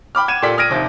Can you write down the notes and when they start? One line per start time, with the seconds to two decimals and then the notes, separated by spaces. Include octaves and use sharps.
0.15 G5 B5 D6 F6
0.28 F#5 G#6 D#7 E7
0.42 A#2 G4 A4 D5 B6
0.58 D#6 F6 G#6 A#6 D7 D#7
0.70 A#1 D#2 C3